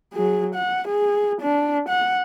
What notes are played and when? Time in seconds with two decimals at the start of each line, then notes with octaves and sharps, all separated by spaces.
0.13 F#3 G#4
0.55 F#5
0.88 G#4
1.41 D4
1.89 F#5